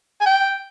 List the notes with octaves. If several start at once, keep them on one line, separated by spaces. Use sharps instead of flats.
G#5
G5